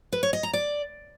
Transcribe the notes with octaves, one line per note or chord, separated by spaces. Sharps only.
B4
C#5
D#5
A#5
D5